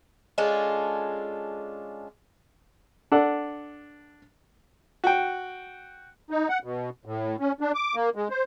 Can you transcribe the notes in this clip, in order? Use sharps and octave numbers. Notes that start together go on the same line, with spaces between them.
G#3 C#4 D4 F4 A4
D4 A4 F#5
F#4 G5
D#4
F#5
B2
A2
C#4
D4
D6
A#3
G#3
C5